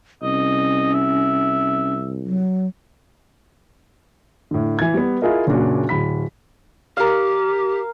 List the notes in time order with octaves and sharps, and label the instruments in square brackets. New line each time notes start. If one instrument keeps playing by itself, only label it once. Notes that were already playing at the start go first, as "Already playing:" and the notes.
[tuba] C2 [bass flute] C#4 [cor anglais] D#5
[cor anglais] E5
[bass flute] F#3
[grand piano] A2 D3
E3 G#6
G3 B3
E4 F4 G#4 A#4 D#5
F#1 A#2 C#4 D4 F#4
D1 B5 B6
[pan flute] G4 [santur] A#4 F5